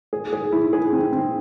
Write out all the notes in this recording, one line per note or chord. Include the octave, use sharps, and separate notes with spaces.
G#4
G#4
E4
G#4
C4
C4